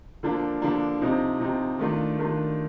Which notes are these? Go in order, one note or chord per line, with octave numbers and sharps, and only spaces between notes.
D3 F3 A#3 D4
D3 F3 A#3 D4
C3 F3 C4 D#4
C3 F3 C4 D#4
D#3 A3 D4 F4
D#3 A3 D4 F4